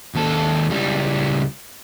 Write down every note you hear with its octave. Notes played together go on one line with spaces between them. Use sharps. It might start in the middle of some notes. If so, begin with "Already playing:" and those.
D#2 A4
C#2 G3